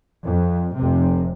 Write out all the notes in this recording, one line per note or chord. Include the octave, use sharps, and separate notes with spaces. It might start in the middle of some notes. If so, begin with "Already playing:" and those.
F2
F1 C3